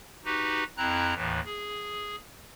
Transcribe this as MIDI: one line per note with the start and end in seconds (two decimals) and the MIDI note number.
0.25 0.64 63
0.25 0.64 66
0.25 0.64 67
0.25 0.64 71
0.77 1.14 41
0.77 1.14 60
0.77 1.14 64
0.77 1.14 82
0.77 1.14 90
1.15 1.40 39
1.15 1.40 45
1.15 1.40 52
1.45 2.16 68